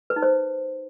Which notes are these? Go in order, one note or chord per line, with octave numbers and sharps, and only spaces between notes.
B4
D#4
C5